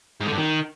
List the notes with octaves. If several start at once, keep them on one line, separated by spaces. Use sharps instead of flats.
G#2
D3
G2
D#3